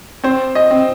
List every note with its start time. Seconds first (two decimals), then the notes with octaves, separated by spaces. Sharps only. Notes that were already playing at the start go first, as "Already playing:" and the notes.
0.24 C4 C5
0.55 D#5
0.71 C4